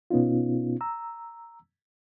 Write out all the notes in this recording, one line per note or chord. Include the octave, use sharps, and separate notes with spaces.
B2 B3 C#4 D#4 F4
A#5 E6